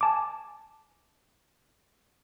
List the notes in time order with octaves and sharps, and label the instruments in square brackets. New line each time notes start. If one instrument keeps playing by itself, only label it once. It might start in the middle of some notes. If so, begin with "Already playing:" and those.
[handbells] G#5 A5 D6